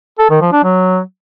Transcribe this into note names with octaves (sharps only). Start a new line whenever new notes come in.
A4
D#3
F3
D4
F#3